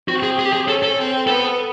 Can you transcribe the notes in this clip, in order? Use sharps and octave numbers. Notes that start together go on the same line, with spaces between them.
C4 F#4
G#4
G#4
G4
G#4
C#4 A4
A4
C4
B3 A4